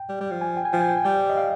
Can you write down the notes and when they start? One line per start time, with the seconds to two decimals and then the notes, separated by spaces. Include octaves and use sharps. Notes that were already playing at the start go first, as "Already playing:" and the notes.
Already playing: G5
0.09 G3
0.20 G3
0.31 F3
0.41 G#5
0.57 G5
0.65 G#5
0.73 F3 G5
0.81 G#5
0.89 G5
0.97 G#5
1.04 G3 G5
1.30 D#5
1.37 F5